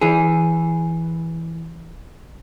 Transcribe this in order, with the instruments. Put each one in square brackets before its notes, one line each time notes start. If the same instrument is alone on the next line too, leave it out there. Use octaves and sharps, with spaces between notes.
[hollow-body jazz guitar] E3 G#4